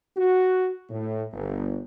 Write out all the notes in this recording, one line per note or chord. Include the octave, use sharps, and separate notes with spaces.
F#4
A2
G1